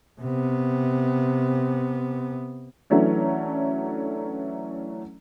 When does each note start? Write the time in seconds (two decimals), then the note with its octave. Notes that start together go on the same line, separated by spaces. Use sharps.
0.20 C3 B3
2.90 E3 F#3 A3 C#4 D4